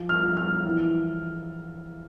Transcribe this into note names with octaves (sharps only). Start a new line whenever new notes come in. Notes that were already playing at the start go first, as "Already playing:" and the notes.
Already playing: F3
F6
F3
F6
E3